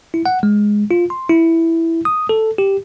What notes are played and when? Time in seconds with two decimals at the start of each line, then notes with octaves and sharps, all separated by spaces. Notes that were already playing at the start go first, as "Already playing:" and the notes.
0.14 E4
0.26 F#5
0.43 G#3
0.91 F4
1.10 C6
1.29 E4
2.05 D#6
2.29 A4
2.58 G4